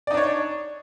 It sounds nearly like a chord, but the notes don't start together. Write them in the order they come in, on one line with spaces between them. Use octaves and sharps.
D5 D#4 D4 C#5